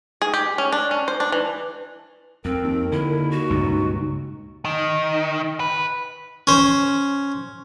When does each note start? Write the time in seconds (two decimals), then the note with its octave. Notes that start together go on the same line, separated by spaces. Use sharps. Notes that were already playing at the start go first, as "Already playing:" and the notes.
0.22 G#4
0.34 G4
0.58 C#4
0.72 D4
0.91 C#4
1.08 C5
1.20 D4
1.32 E3
2.45 F2 C4 A#4
2.64 D#2
2.92 D3 E4
3.31 F#4
3.50 C#2 G2 A#2 D#4
4.65 D#3
5.60 B4
6.47 C#4 C5